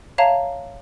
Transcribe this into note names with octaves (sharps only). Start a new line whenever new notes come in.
C#5 E5 F5 A5 A#5